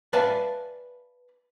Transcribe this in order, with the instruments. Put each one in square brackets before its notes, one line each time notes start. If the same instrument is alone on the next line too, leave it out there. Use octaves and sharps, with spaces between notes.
[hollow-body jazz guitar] B4 D5 E5 F5 G#5 A5